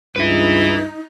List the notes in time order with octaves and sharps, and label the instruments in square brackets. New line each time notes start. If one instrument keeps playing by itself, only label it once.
[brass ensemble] C#2 G2 [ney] D#4 [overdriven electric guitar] B4 E5